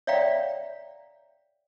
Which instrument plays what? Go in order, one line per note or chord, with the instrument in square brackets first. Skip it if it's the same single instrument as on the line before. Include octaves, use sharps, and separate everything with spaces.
[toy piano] C#5 D5 E5 F5 G5 A#5